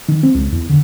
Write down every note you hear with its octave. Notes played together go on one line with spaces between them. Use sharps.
D#3
C4
C#2
E2
D3